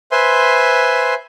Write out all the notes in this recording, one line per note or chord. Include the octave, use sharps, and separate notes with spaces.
B4 C5 E5 G#5 C6